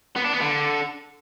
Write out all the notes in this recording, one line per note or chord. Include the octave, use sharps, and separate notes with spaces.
B3
D4
B3
D3